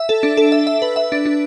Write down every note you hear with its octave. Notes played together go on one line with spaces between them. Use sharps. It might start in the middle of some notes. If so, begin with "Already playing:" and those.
Already playing: E5
A4
D4
A4
E5
E5
B4
E5
D4
D4